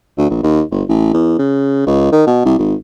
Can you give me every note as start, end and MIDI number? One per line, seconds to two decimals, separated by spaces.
0.18 0.28 38
0.30 0.41 34
0.43 0.62 39
0.71 0.83 31
0.89 1.10 33
1.14 1.36 40
1.38 1.84 49
1.87 2.12 37
2.12 2.25 51
2.27 2.41 47
2.45 2.54 36
2.59 2.74 32